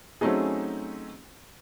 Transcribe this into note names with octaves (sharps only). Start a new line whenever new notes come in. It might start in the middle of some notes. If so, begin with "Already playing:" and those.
F#3 A3 C4 C#4 D#4 G#4